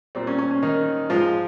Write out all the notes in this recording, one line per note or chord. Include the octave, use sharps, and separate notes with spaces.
A#2 G3 C4
C#4
C#4
C#4
D#3 D#4
G#2 F3 G#3 F4